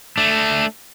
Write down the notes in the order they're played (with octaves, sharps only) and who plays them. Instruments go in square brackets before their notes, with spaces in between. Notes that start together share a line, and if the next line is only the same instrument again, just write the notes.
[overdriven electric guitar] A3 D4